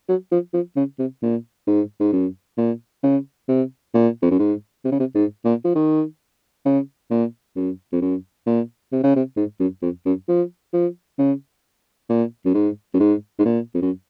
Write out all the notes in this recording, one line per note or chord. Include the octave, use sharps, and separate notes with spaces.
F#3
F3
F3
C#3
C3
A#2
G#2
G#2
F#2
A#2
C#3
C3
A#2
F2
F#2
G#2
C3
C#3
C3
G#2
A#2
F3
D#3
C#3
A#2
F#2
F2
F#2
A#2
C3
C#3
C3
G#2
F#2
F2
F#2
F3
F3
C#3
A#2
F#2
G#2
F#2
G#2
G#2
A#2
F2
F#2